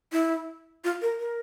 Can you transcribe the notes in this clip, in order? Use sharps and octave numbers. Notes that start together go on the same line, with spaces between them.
E4
F4
A#4
A#4